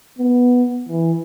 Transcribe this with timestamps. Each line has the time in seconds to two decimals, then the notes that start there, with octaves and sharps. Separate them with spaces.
0.18 B3
0.89 E3